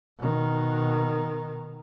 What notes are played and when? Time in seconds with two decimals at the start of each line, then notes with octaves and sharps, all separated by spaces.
0.18 B2 D#3